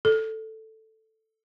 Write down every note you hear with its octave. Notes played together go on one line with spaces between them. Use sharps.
A4